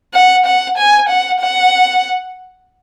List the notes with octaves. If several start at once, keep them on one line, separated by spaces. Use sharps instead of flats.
F#5
F#5
G#5
F#5
F#5